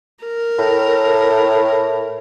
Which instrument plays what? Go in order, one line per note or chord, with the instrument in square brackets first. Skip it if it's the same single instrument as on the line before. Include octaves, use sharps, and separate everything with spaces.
[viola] A#4
[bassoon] A2